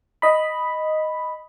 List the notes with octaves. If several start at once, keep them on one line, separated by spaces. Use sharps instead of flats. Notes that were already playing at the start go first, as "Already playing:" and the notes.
D#5 B5